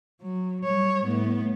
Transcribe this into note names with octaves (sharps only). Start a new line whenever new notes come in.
F#3
G3 C#5
A2 B3